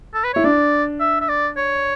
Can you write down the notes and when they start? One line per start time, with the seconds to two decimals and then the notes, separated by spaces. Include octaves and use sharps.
0.14 A4
0.24 B4
0.34 E4 C#5
0.44 D4 D5
1.00 E5
1.21 E5
1.29 D5
1.57 C#5